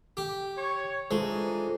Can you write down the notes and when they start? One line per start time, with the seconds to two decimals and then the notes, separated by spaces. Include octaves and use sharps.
0.17 G4
0.58 C#5
1.11 E3 G#3 D4 D#4 F4 A4 C5